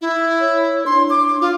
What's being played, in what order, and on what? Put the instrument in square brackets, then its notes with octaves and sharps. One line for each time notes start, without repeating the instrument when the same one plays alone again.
[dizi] E4
[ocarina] C#5
[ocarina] D4 [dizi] C6
[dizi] D6
F4